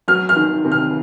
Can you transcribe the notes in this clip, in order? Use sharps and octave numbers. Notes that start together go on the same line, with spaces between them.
F#3 F6
F6
D#3
C3
F6